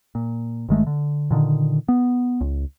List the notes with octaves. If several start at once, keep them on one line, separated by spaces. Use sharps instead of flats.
A#2
G1 D#3 G#3 A3
D3
A#2 D3 D#3
B3
C#2